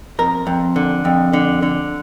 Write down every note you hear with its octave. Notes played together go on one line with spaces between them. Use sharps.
F2 A#4
F2
D3
F2
D3
D3